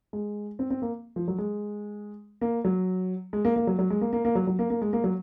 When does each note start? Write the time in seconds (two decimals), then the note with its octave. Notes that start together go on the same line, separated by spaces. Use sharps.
0.13 G#3
0.59 C4
0.70 C4
0.82 A#3
1.16 F3
1.28 F#3
1.38 G#3
2.41 A#3
2.65 F#3
3.33 G#3
3.45 A#3
3.56 A#3
3.67 F#3
3.79 F#3
3.90 G#3
4.01 A#3
4.13 A#3
4.25 A#3
4.35 F#3
4.47 F#3
4.59 A#3
4.70 A#3
4.82 G#3
4.93 A#3
5.04 F#3